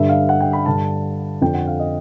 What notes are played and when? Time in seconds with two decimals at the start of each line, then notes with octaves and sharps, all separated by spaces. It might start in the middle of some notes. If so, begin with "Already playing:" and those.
Already playing: G2 D3 E5
0.09 F5
0.29 F#5
0.40 G5
0.53 B5
0.66 G2 D3 A5
1.42 F2 D3 G5
1.54 F#5
1.67 F5
1.79 D#5